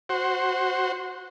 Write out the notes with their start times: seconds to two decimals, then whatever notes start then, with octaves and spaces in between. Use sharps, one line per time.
0.09 F#4 C5